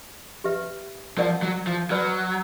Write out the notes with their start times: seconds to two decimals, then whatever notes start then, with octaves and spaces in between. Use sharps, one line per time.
0.44 G4 B4 E5
1.18 F3 A#4 D5 F#5 A5
1.43 F#3
1.67 F3
1.90 F#3 B4 D5 G5 B5